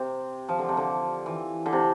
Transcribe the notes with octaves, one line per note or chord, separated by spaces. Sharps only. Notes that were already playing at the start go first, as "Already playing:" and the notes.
Already playing: C3
F3
D3
C3
D3
E3
D3
C3